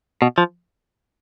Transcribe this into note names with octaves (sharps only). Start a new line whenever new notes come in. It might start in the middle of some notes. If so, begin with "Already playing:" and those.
B2
F3